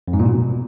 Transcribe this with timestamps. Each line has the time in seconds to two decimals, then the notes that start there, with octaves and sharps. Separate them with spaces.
0.08 F2
0.13 G#2
0.19 A#2
0.25 B2